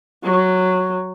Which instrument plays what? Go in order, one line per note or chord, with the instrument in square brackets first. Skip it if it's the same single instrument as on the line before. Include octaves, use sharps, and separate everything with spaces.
[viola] F#3